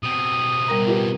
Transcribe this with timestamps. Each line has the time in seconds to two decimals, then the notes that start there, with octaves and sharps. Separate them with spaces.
0.03 B2 C4 D#6
0.68 G3 A#4 A#5
0.86 F4 G4 B4